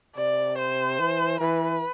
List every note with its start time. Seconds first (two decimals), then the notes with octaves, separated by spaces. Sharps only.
0.17 C3 D5
0.58 C5
0.99 E3
1.40 E3 B4